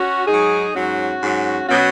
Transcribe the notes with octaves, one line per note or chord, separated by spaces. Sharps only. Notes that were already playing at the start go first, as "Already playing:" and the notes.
Already playing: C#4 F#4
G#2 F#3 D#4 G#4
G#2 F#3 C#4 F#4
G#2 F#3
B2 F#3 C#4 F#4